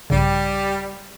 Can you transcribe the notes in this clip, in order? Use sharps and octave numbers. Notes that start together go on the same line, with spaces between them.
A#1 G2 C#3 G3